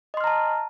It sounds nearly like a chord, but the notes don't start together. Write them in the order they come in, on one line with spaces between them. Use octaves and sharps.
D#5 C6 F6 A#5 A5